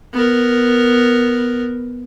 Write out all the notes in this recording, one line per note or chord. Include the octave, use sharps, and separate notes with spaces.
B3 A#4